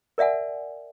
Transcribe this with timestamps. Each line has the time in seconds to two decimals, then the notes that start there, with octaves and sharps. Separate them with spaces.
0.18 A#4 D5 E5 F#5 G#5